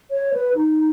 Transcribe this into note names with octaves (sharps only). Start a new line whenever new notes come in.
C#5
B4
D#4